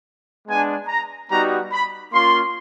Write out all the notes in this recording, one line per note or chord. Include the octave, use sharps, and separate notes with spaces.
G#3 B3 D4 G#5
A#5
G3 B3 D#4 F#4 A#5
B5
A#3 C#4 F4 C6